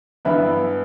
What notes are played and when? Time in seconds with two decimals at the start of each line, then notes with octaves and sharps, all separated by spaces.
0.25 G2 E3 B3 B4 E5